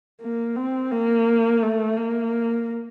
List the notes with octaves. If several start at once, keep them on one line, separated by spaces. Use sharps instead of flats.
A#3
C4
A#3
A3
A#3